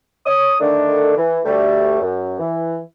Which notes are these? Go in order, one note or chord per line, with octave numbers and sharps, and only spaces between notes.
C#5 D#6
D3 D#3 A3 D4
E3
D2 G3 A3
F#2
E3